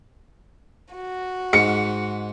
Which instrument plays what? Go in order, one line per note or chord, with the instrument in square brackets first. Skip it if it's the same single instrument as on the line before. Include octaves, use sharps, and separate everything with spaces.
[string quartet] F#4
[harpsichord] G#2 [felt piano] C#7